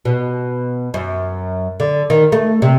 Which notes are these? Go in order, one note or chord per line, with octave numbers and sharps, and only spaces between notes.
B2
F#2
D3
D#3
A3
C3